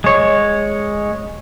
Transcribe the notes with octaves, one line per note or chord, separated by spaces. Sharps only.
G#3 C#5